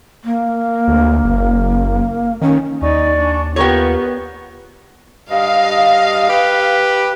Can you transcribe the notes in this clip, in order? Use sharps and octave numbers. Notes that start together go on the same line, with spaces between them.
A#3
D2
F#1
D#3 C#4
D#2 D#4 D5 G#5 C#6
D4
B3 F4 G4 A#4 C#5 F#5
G2 D#5 F5
G4 B4